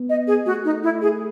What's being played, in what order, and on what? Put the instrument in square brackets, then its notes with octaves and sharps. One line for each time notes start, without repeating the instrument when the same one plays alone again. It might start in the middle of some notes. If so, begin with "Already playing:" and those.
Already playing: [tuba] B3
[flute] D#5
G#4
[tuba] A3 [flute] F#4
[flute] D#4
E4
G#4